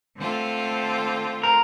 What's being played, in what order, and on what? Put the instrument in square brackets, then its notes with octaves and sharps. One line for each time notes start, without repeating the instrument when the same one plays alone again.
[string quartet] D3 A3 C4 F4 A4
[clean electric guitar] A#4